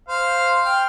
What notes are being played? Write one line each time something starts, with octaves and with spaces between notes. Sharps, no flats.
C5 F5
G5 F6